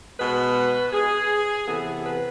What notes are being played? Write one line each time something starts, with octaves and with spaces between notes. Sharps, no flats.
B2 G#3 B3 B4
G#4
C3 E3 B3 A4
B4